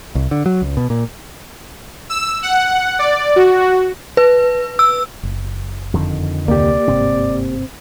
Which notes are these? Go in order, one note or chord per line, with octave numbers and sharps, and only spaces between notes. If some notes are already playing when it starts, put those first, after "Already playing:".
C2
D3
F#3
C#2
B2
A#2
E6
F#5
D5
F#4
B4
E6
F#1
F2 D3 D#3
D2 C3 A#3 G4 D5
G1 G#2 C3 C4